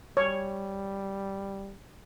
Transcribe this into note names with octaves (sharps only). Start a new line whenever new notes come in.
G3 C#5